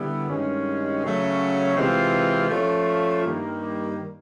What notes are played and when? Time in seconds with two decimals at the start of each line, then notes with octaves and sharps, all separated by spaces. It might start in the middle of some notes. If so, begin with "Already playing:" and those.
Already playing: D3 G3 B3 E4
0.28 G2 D#3 G#3 C#4
1.02 C#3 F#3 A3 C#4 F#4
1.76 C3 E3 G#3 C4 F4
2.50 F3 A3 C#4 F4
3.24 G2 D#3 G3 A#3